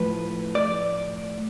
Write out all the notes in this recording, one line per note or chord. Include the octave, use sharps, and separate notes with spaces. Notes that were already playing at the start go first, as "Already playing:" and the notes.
Already playing: A2 F3 B4
D5